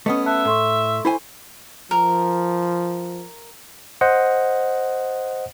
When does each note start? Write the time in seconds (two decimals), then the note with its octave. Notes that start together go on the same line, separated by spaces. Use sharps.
0.06 A3 B3 C#4 D#5 D#6
0.26 E5 A5 F#6
0.45 A2 A4 C6 C#6
1.05 E4 C5 G#5
1.91 F3 A#4
4.01 C5 D#5 F#5